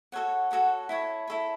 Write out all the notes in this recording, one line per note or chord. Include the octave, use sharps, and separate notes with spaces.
F#4 A4 C#5 F#5
F#4 A4 C#5 F#5
E4 A4 C#5
E4 A4 C#5